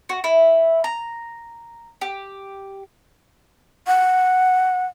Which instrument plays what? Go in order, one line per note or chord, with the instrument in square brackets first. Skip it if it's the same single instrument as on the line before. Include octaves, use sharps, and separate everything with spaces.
[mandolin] F#4
E4
A#5
G4
[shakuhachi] F#5